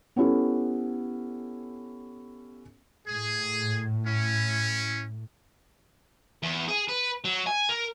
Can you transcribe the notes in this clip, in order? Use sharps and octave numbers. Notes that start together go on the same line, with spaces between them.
B3 C#4 E4 G4 A4
A2 G#4
C#4 E4
E2
G#4
B4
F#3
G#5
A#4